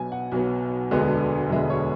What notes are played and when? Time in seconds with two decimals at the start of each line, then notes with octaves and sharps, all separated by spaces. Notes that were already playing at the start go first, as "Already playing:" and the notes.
Already playing: B1 B2 F#3 B3 G#5
0.12 F#5
0.32 B1 B2 F#3 B3
0.91 E1 D2 D3 G#3 B3
1.50 E1 D2 D3 G#3 B3 E5
1.70 C#5